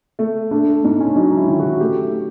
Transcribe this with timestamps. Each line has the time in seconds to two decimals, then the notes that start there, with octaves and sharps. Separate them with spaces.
0.19 A3
0.51 A3 D4
0.84 G#2
1.00 C#4
1.08 D4
1.16 F#3 D#4
1.37 E4
1.48 D#3
1.59 F#4
1.80 A3 G4